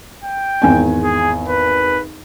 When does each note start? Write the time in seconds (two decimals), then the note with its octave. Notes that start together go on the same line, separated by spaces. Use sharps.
0.24 G5
0.62 G#1 E2 G#5
1.04 G#4
1.48 B4